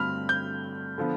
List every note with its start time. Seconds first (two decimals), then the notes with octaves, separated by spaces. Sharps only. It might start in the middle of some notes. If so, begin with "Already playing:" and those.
Already playing: G2 D3 A3 C4 B5 F6
0.29 G6
0.98 D3 F3 B3